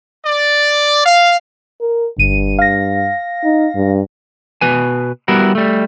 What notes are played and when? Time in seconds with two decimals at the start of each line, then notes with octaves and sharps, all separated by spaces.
0.24 D5
1.04 F5
1.81 A#4
2.18 G1 G2 D#7
2.59 F5 A#6
3.44 D#4
3.75 G2
4.61 B2 B4 G#5
5.28 G3 B3 E4 F#4 A#4
5.55 G3 A3